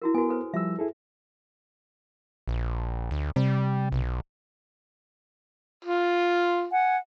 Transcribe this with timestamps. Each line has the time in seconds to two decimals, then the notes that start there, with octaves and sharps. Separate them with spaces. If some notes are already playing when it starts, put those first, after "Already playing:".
0.02 E4 F#4 A#4
0.14 B3 F#4 A#4 G#5
0.29 A4 B4 C5
0.54 F3 G3 E5 E6
0.79 E4 G#4 A4
2.48 A#1
3.11 D2
3.36 C3 G3
3.92 B1
5.85 F4
6.71 F#5 G#5